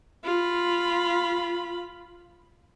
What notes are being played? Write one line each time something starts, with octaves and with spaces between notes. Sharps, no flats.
F4 B5